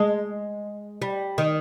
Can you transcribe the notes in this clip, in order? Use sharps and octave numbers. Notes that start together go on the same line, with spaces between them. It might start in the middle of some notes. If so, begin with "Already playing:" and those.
Already playing: G#3
G3
D#3